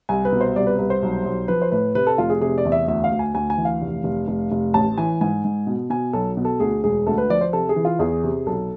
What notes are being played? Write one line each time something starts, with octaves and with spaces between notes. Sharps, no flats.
C2 G#5
B4
B2
C5
C2 D5
B4
C2 B4
C5
B1
B1
F3 B4
C5
A2 B4
C3 B4
A4
F1 F4
G#4
C3 G#4
D5
E2
E5
D2 E5
F5
D2
G#5
D2 G#5
G#5
E3
F5
F1
F1
F1
F1
A1 A5
E3 G#5
G#2 G#5
G#2
B2
B2 G#5
B1 A4
B2
A4
D2 G#4
E1 G#4
D2 A4
B4
F3 D5
C5
C3 A4
G#4
E3
F4
E2 G#4
C3
B1 A4